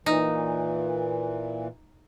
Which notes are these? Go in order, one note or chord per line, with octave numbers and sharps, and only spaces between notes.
A#2 E3 D#4